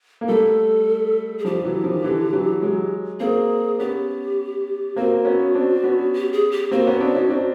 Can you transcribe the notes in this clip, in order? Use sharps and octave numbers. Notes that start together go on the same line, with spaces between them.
A#3
G3 A3 A4
G#4
F3 G3 G4
E3 F#3
D#3 F3
D3 E3
E3 F#3
F#3 G#3
A#3 C4 G#4
B3 C#4 G4
A#3 C4 F#4
B3 C#4
C4 D4
B3 C#4
G4
G#4
G4
A#3 C4 F#4
B3 C#4
C4 D4
C#4 D#4
C4 D4